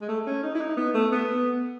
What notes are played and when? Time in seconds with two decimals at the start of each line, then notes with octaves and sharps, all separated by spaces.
0.02 G#3
0.09 A3
0.27 C#4
0.43 D#4
0.55 E4
0.61 D#4
0.77 B3
0.94 A3
1.12 B3